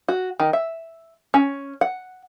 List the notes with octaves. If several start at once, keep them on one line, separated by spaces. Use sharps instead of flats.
F#4
D#3
E5
C#4
F#5